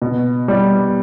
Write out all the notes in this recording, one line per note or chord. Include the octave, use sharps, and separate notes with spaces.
B2
G3